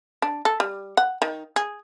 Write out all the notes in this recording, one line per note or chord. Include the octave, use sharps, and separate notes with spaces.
D4
A4
G3
F#5
D#3
G#4